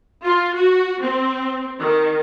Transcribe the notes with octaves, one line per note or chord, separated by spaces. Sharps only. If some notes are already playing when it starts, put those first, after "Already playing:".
F4
F#4
C4
D#3